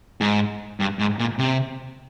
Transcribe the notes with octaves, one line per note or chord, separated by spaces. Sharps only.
G#2
G2
G#2
A#2
C3